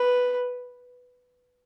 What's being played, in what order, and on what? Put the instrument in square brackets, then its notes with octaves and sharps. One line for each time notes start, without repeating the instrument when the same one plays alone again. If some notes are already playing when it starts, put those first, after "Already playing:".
Already playing: [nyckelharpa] B4